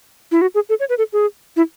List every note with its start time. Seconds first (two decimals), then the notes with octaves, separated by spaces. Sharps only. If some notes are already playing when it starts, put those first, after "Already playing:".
0.32 E4
0.42 F#4
0.55 G#4
0.69 A4
0.80 C#5
0.89 B4
0.98 A4
1.13 G#4
1.56 E4